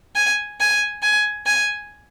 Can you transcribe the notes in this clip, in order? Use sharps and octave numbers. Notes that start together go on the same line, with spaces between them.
G#5
G#5
G#5
G#5